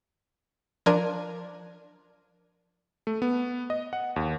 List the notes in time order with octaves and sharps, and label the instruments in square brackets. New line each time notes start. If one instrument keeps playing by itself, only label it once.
[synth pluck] F3 D4 A#4 G#6 D#7
[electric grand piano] A3
B3
D#5
F#5
D#2